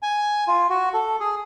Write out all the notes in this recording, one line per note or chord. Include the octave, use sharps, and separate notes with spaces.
G#5
F4
F#4
A4
G#4